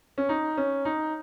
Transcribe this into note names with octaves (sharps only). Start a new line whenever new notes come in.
C#4
D#4
C#4
D#4